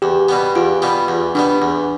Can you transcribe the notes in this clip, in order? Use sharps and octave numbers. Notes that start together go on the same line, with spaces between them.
E2 G4
B2 G3 B3
E2 F4
B2 G3 B3
E2
B2 G3 B3 D4
E2